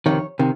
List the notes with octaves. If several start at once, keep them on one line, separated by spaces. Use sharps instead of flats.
F2 C3 D#3 C#5
C3 D#3